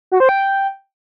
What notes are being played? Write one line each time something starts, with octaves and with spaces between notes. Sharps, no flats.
F#4
C5
G5